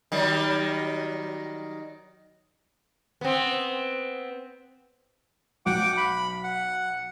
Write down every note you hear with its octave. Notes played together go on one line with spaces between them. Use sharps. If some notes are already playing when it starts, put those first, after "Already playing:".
D#3 F#3 G3
B3 C4
B1 F#5 G5 D6
B5
F#5